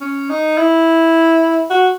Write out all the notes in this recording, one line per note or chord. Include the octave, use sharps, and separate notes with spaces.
C#4
D#4
E4
F#4